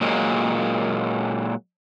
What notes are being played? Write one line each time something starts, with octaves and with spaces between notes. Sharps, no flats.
A#2 F#3 G#3 A#3